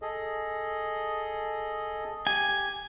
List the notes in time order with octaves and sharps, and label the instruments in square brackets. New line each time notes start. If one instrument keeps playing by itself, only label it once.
[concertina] G#4 A4 D#5
[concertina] G4 [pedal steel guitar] G#5